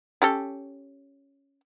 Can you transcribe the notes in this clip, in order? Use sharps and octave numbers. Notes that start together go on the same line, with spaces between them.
C#4 G4 A4